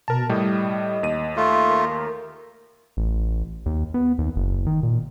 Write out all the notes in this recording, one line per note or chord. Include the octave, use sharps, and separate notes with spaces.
B2 A#4 A5
A2 G3 D#5
D#2 D#7
A3 F4
A#4
A1
D#2
B3
D#2
F#1
D#3
A#2